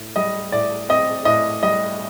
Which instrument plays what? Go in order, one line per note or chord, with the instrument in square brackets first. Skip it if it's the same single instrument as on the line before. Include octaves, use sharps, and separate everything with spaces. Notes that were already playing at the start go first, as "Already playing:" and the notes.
Already playing: [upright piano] A2
G3 D#5
A2 D5
C4 D#5
A2 D#5
G3 D#5